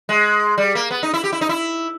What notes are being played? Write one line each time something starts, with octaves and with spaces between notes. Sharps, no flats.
G#3
G3
A#3
B3
D#4
E4
G4
E4
D#4
E4